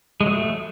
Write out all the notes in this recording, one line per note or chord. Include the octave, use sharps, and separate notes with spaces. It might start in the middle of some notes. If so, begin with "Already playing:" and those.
G#3
F#3
A3